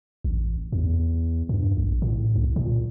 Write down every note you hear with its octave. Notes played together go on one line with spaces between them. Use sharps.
A1
E2
G2
A#1
A2
C2
A#2